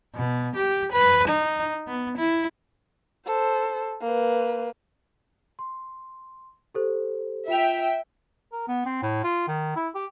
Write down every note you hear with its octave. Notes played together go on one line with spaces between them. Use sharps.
B2
G4
B4
D#4
B3
E4
A4 C5
A#3 B4
C6
G4 A4 C5
F4 E5 G5 F7
A#4
B3
C4
A2
F4
D#3
E4
G4